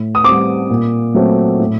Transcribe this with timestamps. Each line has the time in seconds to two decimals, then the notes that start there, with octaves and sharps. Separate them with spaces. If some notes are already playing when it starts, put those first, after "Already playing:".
Already playing: A2
0.15 D#6
0.24 G3 C4 D6
0.70 A#2
1.15 F#3 A3 C4
1.60 A2